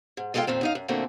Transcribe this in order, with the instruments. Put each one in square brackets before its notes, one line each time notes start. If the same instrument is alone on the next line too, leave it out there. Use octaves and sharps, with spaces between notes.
[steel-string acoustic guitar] G#2
G#3 F4 A4 D#5 F5 G5
F2 A#2 D#3 C4
F#2 D#4 F5
F#2
D2 A#2 D3 A3 A#3 C4